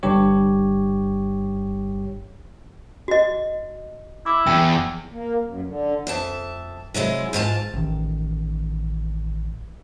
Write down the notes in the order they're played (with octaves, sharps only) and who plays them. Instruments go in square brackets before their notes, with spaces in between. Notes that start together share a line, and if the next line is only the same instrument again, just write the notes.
[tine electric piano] G1 G2 G4 C#5
[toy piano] F#4 D#5
[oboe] E4 [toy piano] D6
[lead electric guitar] E2 [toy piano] G5
[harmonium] A#3
F#2
D3
[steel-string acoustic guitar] F2 E5 A5
C3 F#3 G#3 E4
G#2 F4 A#4 A5
[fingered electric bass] A1 D#3